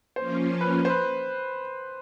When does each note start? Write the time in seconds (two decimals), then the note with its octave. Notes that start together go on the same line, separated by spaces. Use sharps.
0.16 F3 A#3 C#4 F4 C5
0.61 B4
0.85 C5
0.90 B4